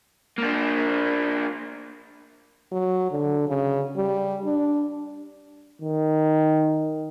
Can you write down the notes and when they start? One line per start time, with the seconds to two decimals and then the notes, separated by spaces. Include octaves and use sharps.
0.38 A#3 D4
2.72 F#3
3.11 D3
3.48 C#3
3.96 G3
4.45 D4
5.82 D#3